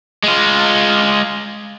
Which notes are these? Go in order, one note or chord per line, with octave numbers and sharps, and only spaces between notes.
G#3 F4